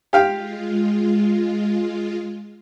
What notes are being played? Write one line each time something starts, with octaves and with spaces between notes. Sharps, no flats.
G#3 F4 G4 F5 G5